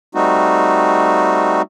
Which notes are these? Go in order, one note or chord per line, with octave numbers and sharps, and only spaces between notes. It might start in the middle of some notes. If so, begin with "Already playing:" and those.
G3 A3 C4 D#4 F#4